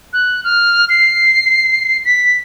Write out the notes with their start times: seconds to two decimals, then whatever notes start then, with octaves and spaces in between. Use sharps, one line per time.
0.13 F#6
0.44 F6
0.89 C7
2.05 B6